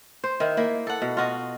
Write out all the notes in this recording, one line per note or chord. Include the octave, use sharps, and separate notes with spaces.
C5
D#3 E4
A#3 E4
A4 F#5
B2
F4 F#4 D#5